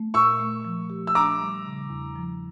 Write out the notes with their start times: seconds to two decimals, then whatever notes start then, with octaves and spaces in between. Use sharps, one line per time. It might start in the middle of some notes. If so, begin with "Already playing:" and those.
Already playing: A3
0.14 A#2 C#6 E6
0.40 A3
0.65 F3
0.90 G4
1.07 E6
1.15 D4 A#5 D6
1.40 G3
1.65 C#3
1.90 E2
2.15 F3